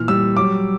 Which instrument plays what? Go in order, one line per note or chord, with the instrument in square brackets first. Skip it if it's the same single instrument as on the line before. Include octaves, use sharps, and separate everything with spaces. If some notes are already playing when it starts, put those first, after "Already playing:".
Already playing: [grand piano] A#2 E3 F6
G3 E6
F#3 D6